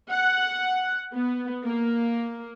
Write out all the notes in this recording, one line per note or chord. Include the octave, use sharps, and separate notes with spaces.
F#5
B3
A#3